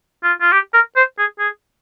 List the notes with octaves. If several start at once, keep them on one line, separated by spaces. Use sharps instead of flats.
F4
F4
G4
A#4
C5
G#4
G#4